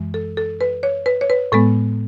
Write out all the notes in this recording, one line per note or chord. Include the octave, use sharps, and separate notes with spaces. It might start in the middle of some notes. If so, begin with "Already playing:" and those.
Already playing: F#2 E3 G#3
A4
A4
B4
C#5
B4
C#5
B4
A2 G#3 B3 A4